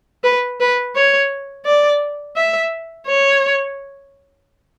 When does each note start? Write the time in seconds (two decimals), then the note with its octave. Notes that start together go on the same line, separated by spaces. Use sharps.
0.24 B4
0.60 B4
0.95 C#5
1.66 D5
2.36 E5
3.07 C#5